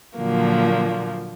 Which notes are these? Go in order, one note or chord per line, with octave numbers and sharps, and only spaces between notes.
A#2 D3 F3 F#3 A#3